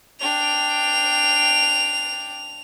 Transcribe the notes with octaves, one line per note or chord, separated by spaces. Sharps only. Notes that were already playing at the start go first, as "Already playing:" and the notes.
D4 G5 F7